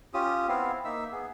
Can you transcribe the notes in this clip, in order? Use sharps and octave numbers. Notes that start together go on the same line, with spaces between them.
C#4 F4 G4 D#6
B3 C4 E4 F5
A#3 D#4 E5 E6
B3 G#4